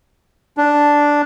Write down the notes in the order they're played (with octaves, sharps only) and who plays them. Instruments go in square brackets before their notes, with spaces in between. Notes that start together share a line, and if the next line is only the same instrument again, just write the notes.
[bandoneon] D4